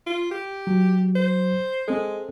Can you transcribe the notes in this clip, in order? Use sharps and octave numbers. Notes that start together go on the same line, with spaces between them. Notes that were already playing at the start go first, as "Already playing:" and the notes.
F4
G4
F#3
C5
G#3 C4 A4